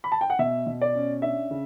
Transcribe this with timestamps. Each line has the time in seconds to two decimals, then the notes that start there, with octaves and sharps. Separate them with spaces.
0.04 B5
0.12 A5
0.21 G5
0.30 F#5
0.39 B2 E5
0.67 B2
0.81 D5
0.95 C#4
1.22 D4 E5
1.50 C#3